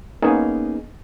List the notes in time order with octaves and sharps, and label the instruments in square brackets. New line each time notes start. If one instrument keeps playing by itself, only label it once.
[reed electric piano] A#3 B3 C#4 D#4 G#4